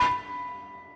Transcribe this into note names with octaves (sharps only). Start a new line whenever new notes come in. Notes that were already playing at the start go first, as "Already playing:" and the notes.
Already playing: B5